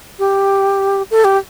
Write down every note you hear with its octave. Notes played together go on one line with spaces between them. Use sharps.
G4
A4
G4